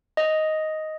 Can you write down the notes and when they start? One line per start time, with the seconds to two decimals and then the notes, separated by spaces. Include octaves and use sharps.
0.17 D#5